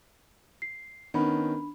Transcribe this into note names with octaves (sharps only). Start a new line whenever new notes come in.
C7
D#3 B3 C#4 D4 B5